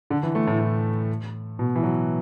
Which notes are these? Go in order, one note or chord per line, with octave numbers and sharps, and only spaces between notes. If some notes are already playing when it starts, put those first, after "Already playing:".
D3
E3
A3
A2
A2
B2
E3
F#3